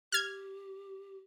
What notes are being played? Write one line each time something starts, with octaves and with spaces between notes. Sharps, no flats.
G4 F6 G#6